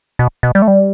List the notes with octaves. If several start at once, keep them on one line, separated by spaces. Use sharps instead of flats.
B2
B2
G3
A3
G3